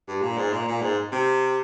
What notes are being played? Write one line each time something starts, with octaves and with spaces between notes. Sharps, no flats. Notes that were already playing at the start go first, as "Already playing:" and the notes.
G2
A#2
G#2
A#2
A#2
G#2
C3